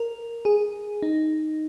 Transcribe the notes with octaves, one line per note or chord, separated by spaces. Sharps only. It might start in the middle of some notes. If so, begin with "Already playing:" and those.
Already playing: A#4
G#4
D#4